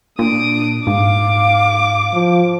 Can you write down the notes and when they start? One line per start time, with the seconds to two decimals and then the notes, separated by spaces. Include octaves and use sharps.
0.19 A#2 D4 D#6 D7
0.87 G#2 F5 D6
2.13 F3